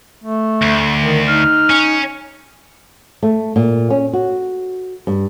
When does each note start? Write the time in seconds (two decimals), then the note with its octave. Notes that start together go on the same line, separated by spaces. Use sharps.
0.24 A3
0.62 D2
1.02 D#3
1.28 D#4 F6
1.70 C#4
3.23 A3
3.56 A#2
3.90 C#4
4.13 F#4
5.07 G2